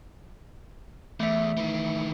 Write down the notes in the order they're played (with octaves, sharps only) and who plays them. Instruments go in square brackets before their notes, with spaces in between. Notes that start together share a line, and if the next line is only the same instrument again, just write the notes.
[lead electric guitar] E2 [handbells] A3 E5
[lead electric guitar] D#3 E3